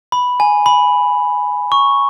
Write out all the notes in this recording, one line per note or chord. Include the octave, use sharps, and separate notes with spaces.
B5
G#5
B5
C#6